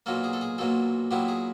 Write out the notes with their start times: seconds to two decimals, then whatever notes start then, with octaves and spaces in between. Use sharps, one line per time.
0.06 B1 A#2 F#3 A#3 A4
0.24 G#4
0.33 A4
0.41 G#4
0.58 B1 A#2 F#3 A#3 A4
1.11 A#2 F#3 B3 E4 G4
1.28 G#4